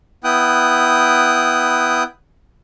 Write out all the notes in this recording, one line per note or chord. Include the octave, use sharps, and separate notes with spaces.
B3 E4 G5 D#6 F#6